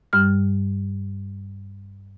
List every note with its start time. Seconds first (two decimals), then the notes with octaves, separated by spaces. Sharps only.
0.13 G2 G3 F6